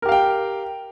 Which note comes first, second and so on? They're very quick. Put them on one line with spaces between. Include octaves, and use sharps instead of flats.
A#4 G4 F5 G5